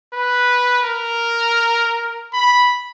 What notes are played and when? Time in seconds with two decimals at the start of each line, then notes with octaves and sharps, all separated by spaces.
0.13 B4
0.83 A#4
2.33 B5